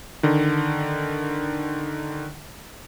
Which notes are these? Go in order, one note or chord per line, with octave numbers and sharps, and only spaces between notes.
D3 D#3